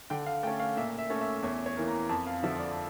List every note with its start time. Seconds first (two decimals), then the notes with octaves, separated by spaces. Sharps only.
0.10 D3 G5
0.26 F5
0.43 A3 G5
0.47 C#4
0.60 F5
0.77 A#2 E5
0.98 E5
1.10 A3 C#4
1.21 E5
1.43 E2 C#5
1.66 C#5
1.77 E3 A#3
1.88 A#5
2.09 F2 A5
2.27 F5
2.43 D3 F3 E5
2.59 D5